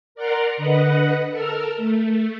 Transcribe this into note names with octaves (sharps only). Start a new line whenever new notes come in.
A#4 D5 F#5 A#5 C6 D6
D3 B4 D#5 F#5
A4 A#4 E6 F6
A3